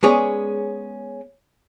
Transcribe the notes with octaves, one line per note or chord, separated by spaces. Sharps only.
G#3 B3 C#4 G#4 C#5 D5